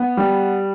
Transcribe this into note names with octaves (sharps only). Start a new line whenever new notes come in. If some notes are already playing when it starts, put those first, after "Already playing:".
Already playing: B3
G3